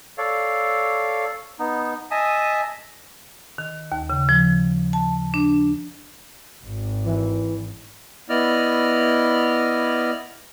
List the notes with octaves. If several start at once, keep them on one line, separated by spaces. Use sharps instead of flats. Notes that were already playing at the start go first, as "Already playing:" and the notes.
A4 C#5 D5 F5
B3 D#4
D#5 E5 G#5 A5 D#6
D#3
D#2
C#3
F3
A5
D4
G#1
E3
B3 E4 D5 D#5 F6